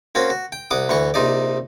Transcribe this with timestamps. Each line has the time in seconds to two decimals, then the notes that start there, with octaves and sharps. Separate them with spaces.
0.15 A#3 C4 C#4 F#4
0.30 F#4
0.52 G5
0.71 C2 F#5 D6 D#6
0.89 D2 E3 F#5 C#6
1.14 A#1 C3 D#4 D5